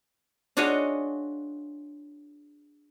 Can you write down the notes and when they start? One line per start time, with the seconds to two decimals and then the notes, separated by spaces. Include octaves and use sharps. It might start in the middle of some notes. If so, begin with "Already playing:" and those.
0.57 D4 F4 F#4 G#4 C#5 D#5